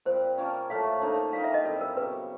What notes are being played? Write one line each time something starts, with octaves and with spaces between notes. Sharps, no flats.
A#2 G3 C4 F4 C5
F3 A#3 C#4
A2 F3 A3 F5
D3 F3 A#3 D#4
G3 A#3 D#4 F5
E5
D#5
A#2 G3 C4 E4 A4
A#4
C#3 F#3 B3 B4